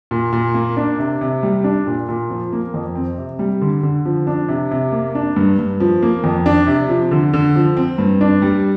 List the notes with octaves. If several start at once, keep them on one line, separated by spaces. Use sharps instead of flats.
A#2
A#2
A#3
D4
C3
C3
G3
D4
A#2
A#2
F3
A#3
F2
C4
C3
G3
D3
D3
F3
D4
C3
C3
A#3
D4
G2
G2
F3
A#3
F2
D4
C3
F3
D3
D3
F3
C4
G2
D4
G3